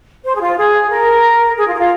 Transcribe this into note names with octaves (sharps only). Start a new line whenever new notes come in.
C5
G#4
F4
G#4
A#4
G#4
F4
G#4
F4